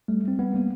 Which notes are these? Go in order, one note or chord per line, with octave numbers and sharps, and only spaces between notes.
G3 A3
G3 C4
G3 B3
G3 A#3